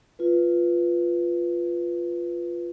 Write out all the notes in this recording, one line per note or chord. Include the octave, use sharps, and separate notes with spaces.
F4 B4